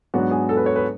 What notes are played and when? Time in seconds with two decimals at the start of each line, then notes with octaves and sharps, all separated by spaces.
0.14 G#2 F#3 B3 D4 F#4
0.31 G#4
0.49 A4
0.57 B4
0.66 C#5
0.76 B4